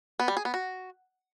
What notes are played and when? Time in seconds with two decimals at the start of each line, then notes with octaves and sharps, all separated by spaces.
0.19 B3
0.28 G3
0.37 G#4
0.45 B3
0.54 F#4